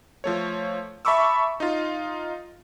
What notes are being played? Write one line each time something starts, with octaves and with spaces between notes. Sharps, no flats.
F3 A3 C#5
E5 A5 B5 C#6 D6 E6
D#4 F4